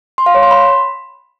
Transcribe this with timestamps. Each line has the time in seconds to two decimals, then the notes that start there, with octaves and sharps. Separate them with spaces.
0.18 C6
0.26 F5
0.35 C#5
0.43 C6
0.51 B5